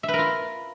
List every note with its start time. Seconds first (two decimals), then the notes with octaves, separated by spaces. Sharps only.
0.03 E5
0.08 B4
0.13 A#4
0.19 F4